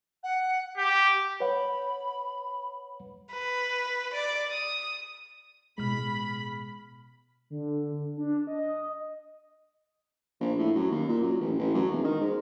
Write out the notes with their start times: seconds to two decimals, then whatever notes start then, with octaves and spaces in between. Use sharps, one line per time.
0.23 F#5
0.78 G4 G6
1.40 B4 C#5 F#5 B5
3.33 B4
4.14 D5
4.52 D#6
5.78 A1 B2 G#3 B5 F6
7.50 D3
8.17 D4
8.47 D#5
10.41 A#1
10.58 A2
10.75 F#2
10.91 D#2
11.08 A#2
11.22 F#2
11.41 A1
11.59 A1
11.74 F#2
11.91 E1
12.04 D#3
12.21 G#2